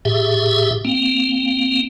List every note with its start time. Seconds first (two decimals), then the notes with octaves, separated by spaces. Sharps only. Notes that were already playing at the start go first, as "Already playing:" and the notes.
0.05 A2 G4 G#4 E5
0.85 A#3 C4